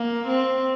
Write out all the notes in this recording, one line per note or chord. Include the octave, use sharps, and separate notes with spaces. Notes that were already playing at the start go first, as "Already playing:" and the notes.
Already playing: A#3
C4